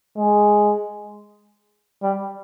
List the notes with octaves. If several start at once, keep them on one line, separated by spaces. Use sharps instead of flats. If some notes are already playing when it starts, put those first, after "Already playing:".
G#3
G3